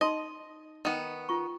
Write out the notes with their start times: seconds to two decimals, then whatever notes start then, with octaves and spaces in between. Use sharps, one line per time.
0.01 D#4 D#5 C6
0.85 D#3 B3
1.29 F4 C#6